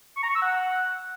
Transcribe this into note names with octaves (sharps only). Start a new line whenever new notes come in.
C#6
A#5
C#6
E6
F#5